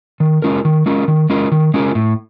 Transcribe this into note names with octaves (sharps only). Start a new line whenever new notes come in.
D#3
G#3 C#4 F4 A#4
D#3
G#3 C#4 F4 A#4
D#3
G#3 C#4 F4 A#4
D#3
G#3 C#4 F4 A#4
A2